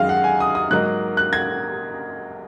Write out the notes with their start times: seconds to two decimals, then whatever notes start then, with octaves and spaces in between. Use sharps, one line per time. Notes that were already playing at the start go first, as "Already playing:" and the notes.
Already playing: F#2 D#3 G#3 D#4 D#5 F5
0.09 F#5
0.24 G#5
0.40 D#6
0.55 D#6
0.71 G#2 F#3 A#3 D#4 F#6
1.17 F#6
1.33 G#6